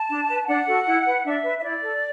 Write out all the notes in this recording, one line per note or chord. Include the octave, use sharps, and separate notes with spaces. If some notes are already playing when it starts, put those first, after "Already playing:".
Already playing: A5
D4
B4
D4 F#5
F#4 A4
E4
B4
D4 E5
B4
E5
E4 D5
A4